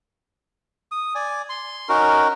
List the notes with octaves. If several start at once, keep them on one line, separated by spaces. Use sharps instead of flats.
D#6
D5 G#5
C6
C#4 D#4 F#4 A#4